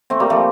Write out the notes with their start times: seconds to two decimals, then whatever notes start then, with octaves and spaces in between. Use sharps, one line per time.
0.10 A3 C4
0.20 G3 A#3
0.30 F3 A3